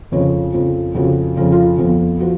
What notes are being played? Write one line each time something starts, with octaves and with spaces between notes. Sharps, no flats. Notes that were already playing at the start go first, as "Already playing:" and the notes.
F2 C#3 F3 C#5
F2 C#3 F3
F2 C#3 F3 F#4
F2 C#3 F3 F4
F4
F2 F3 B3
F3 F#4